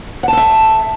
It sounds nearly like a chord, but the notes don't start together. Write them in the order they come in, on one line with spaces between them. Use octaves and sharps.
F#5 A5 A4 E5